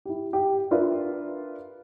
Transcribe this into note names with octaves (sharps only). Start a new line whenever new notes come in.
E4 G4
G4
D4 F4 A#4 B4 D5 E5